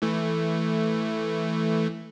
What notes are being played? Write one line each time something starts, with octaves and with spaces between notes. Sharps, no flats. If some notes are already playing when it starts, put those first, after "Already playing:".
E3 A3